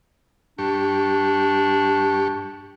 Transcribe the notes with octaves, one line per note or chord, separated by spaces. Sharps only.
G2 D4 G4 C#6